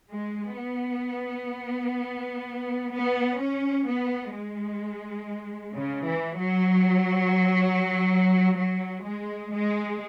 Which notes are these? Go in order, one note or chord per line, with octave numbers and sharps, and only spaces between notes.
G#3
B3
B3
C#4
B3
G#3
C#3
E3
F#3
F#3
G#3
G#3